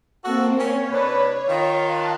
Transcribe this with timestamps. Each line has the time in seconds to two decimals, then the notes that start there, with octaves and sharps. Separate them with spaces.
0.25 A#3 C4 F#4 A4
0.60 C#4 C#5
0.92 C3 D4 B4
1.49 D#3 F4
1.82 F5 A5 F#6